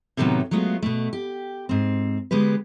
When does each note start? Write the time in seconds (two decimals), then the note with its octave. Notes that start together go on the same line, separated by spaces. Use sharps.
0.17 A2 C3 D#3 F3 F#3 B3
0.51 F#3 G#3 A3 B3 F4
0.82 B2 A3
1.13 G4
1.69 G#2 C4
2.31 D3 G#3 B3 G4 B4